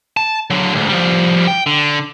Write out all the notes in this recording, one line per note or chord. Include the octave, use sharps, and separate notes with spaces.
A5
D3 F#3
D2 G#2
F3 G3
G5
D3